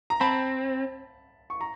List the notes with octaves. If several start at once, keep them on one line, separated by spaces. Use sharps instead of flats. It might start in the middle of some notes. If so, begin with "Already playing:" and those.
A#5
C4 A5 B5
C#6
A#5